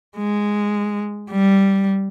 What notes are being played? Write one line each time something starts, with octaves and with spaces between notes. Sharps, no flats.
G#3
G3